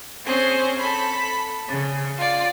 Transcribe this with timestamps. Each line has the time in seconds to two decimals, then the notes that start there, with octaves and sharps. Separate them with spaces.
0.25 C4 C#4 G#4 C5
0.79 A4 B5
1.68 C#3
2.17 F4 D5